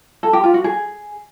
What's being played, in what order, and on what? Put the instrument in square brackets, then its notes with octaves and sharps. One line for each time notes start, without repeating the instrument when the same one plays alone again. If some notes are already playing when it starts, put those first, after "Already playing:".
[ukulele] A4
G4
F4
F#4
G#4